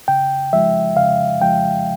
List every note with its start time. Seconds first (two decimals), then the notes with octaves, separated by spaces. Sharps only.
0.08 C#3 G5
0.53 F3 G#3 E5
0.96 C#3 F5
1.42 F3 G#3 G5